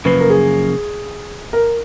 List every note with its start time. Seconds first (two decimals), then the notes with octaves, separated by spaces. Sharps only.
0.05 F#2 C#3 F3 A#3 B4
0.20 A#4
0.30 G#4
1.53 A#4